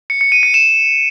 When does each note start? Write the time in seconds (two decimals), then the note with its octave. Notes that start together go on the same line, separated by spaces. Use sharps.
0.10 C#7
0.21 C#7
0.32 D#7
0.43 C#7
0.54 E7